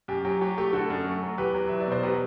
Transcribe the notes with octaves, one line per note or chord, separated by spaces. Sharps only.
F#2 G4
F#3 G4
F#3 G4
A3 G4
D3 F#4 A4
F#2
A3
F#3
E2 G4 B4
F#3
E2 E5
D5
B2 C5
F#3 G4 B4